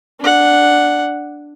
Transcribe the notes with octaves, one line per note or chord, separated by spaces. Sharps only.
D4 F#5